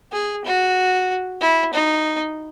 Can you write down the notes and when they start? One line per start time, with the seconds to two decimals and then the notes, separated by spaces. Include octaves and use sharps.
0.12 G#4
0.45 F#4
1.41 E4
1.73 D#4